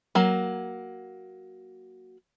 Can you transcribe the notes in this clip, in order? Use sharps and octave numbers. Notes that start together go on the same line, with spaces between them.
F#3 A#3